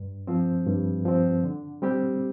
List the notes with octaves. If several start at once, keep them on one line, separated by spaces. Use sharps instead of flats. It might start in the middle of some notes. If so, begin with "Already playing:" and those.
Already playing: G2
F3 C4
G2
F3 C4
D3
G3 C4 G4